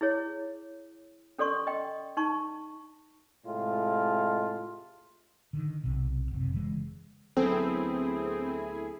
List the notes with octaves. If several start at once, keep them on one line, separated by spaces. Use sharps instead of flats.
E4 G#4 C#5
C#4 A4 D5 C6 C#6
D#5 G5
D#4 A5 C#6
A2 C3 G#3 F4
D3 D#3
B1 C3
F#1 C3
C#3 E3 F#3 G#3
D2 F#3 B3 C4 E4 G#4 A4